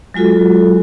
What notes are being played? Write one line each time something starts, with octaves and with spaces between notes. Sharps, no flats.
F#3 G#3 F4 F#4 A4